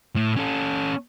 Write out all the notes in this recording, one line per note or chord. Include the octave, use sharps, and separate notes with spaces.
A2
C#4 A4